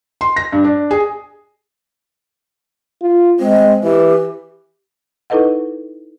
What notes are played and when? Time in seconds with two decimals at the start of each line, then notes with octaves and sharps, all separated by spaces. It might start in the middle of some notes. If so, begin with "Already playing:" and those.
0.21 C6
0.36 A#6
0.52 G2
0.64 D4
0.91 G#4
3.02 F4
3.40 G#3 C4
3.83 E3 G4
5.30 D#4 E4 A4 B4 D#5 F#5